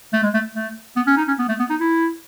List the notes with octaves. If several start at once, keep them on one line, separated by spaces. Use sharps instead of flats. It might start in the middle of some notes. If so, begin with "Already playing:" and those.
A3
G#3
A3
A3
B3
C#4
D#4
C#4
B3
A3
B3
D#4
E4